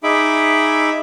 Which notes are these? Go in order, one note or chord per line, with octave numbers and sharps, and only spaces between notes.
D#4 G#4 E5 B5 D6